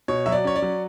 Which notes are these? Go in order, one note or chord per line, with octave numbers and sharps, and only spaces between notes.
B2 C#5
F#3 E5
D5
C#4 C#5
D5
F#3